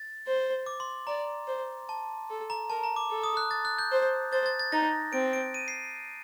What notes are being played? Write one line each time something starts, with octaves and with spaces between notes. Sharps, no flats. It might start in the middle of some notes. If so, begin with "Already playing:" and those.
Already playing: A6
C5
D6
C6
D5 A#5
C5
A5
A4
A#5
A#4 A5
A#5
D6
A4
D#6
F#6
A6
F#6
G6
C5
C5 A6
A6
A6
D#4 A#6
C4 D7
D7
D#7
C7